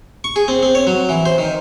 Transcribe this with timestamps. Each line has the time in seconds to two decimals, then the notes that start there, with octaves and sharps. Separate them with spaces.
0.24 C#6
0.36 G#4
0.48 C4
0.63 C4
0.75 C#5
0.87 F#3
1.09 E3
1.26 C5
1.38 D#3